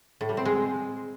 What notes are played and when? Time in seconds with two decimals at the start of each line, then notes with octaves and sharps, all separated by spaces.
0.21 A2
0.29 G3
0.37 C4
0.45 G#3